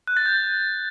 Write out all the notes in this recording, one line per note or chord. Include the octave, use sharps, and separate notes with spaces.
F#6
A6
G6